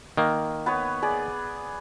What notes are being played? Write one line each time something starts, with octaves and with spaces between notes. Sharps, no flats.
D#3 A#3
B3 B4 C#5
G#4 D5